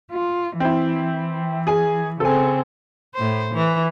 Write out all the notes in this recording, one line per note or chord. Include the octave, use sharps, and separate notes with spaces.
F4
E3 C4 E4
G#4 G#5
C#3 C4 G#4 A4 G#5
A2 C5
E3